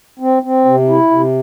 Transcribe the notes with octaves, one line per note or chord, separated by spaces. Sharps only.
C4
C4
C3
E4
C3